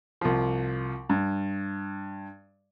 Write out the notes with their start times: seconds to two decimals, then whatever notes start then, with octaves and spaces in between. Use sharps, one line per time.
0.21 C2 F3
1.09 G2